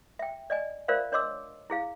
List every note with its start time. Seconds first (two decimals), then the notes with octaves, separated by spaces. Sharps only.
0.19 E5 G5
0.50 D5 D#5 G#5
0.88 F4 A#4 C5 D5 E5 F5
1.12 D4 C#5 D#5 C6 D6 E6
1.70 E4 G#4 F5